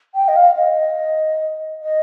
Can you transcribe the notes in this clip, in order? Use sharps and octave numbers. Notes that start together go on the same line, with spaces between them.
G5
D#5
F5
D#5
D#5